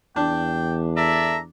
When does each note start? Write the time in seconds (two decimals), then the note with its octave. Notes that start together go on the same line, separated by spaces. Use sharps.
0.16 E2 D4 G5
0.97 A4 D5 E5 A#5